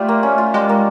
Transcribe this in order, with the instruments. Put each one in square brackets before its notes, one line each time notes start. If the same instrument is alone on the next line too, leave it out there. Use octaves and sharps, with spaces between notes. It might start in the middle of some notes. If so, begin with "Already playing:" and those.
Already playing: [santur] G3 F4 [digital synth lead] A3
[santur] A#3
C#4
F4
[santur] G3 [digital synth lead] G#3
[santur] A#3